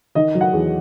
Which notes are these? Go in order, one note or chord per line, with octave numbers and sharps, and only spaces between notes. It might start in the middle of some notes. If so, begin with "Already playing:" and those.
D#3 D#5
F#3
F#5
E2